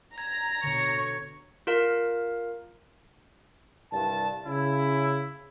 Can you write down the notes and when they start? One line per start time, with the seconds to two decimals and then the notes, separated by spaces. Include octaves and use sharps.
0.18 A#5 G#6
0.64 B2 D3 C#5
1.67 F4 A#4 F5
3.91 C2 G2 A5
4.45 C#3 E4